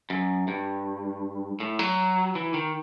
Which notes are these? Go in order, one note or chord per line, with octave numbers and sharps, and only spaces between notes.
F#2
G2
A2
F#3
E3
D#3